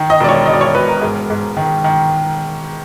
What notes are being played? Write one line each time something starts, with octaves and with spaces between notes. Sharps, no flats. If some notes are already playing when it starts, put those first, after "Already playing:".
Already playing: D#3
D#5
E1 D5
C#5
E1 D#5
D5
C#5
E1 B4
A#4
G#2
G#2
D#3
D#3